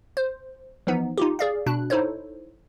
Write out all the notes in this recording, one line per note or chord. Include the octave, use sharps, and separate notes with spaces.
C5
E3 F3 B3 D#4
D#4 F4 G4
G#4 D5 F5
B2 D4 F#6
D#4 E4 A4 C5 C#5